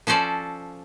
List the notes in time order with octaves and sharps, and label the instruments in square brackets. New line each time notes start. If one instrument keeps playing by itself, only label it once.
[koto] F3 C#4 A4 C5 D5